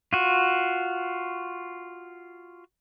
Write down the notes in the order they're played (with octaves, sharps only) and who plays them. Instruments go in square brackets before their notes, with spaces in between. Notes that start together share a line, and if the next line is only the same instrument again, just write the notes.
[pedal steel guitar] F4 F#4